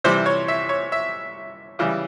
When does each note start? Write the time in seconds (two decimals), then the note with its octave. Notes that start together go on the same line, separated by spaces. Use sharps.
0.04 C3 E3 G3 C5
0.26 C#5
0.48 E5
0.69 C#5
0.92 E5
1.79 C#3 E3 G3